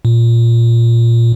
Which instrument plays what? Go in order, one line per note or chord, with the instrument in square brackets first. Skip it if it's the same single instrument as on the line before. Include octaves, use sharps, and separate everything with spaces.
[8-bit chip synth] A#2